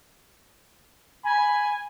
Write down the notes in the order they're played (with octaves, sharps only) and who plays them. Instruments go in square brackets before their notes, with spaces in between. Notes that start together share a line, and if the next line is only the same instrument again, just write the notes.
[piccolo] G#5 [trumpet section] B5